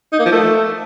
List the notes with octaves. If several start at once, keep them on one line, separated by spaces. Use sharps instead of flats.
D#4
A#3
F3
A3